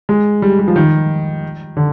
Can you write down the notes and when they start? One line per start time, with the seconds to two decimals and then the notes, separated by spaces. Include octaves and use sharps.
0.09 G#3
0.42 G3
0.59 G3
0.68 F3
0.76 D#3
1.77 D3